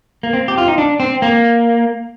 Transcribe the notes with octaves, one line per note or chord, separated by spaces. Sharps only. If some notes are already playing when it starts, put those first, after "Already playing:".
A#3
C4
G4
F4
D#4
D4
C4
A#3